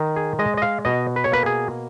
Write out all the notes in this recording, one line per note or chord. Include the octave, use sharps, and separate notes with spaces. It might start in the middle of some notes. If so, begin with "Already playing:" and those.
Already playing: D#3
G#4
G#3 D#5
D#5
F5
B2 D#5
B4
C#5
A#3 B4
G#4